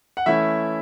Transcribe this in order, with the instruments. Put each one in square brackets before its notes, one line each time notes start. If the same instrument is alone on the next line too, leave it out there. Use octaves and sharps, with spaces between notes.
[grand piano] F#5
E3 A3 C#4 E4 E5